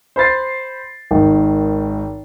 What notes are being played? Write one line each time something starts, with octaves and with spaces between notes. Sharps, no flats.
C5 B5 A6 C7
G#1 D#3